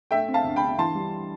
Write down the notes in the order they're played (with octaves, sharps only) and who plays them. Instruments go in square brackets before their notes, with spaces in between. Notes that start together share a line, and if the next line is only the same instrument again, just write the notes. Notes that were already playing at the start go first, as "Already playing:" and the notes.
[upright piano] A3 E5 G5
C4
F5 A5
D2
G5 B5
D3
E3 A5 C6
G3